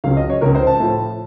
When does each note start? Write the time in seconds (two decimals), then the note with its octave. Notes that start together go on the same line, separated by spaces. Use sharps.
0.04 C#2 C#3 F#3 F5
0.17 D#5
0.30 C#5
0.41 C#2 C#3 F3 A#4
0.55 C5
0.67 A5
0.80 A2 F3